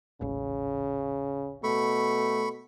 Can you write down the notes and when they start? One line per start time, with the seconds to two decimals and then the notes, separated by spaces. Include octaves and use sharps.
0.21 D#1 A1 C#3
1.64 B2 A3 B5 C#6